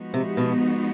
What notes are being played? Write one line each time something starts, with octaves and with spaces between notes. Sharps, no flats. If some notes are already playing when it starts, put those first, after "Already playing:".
Already playing: F3 G#3 B3 D#4 F#4
C3
B2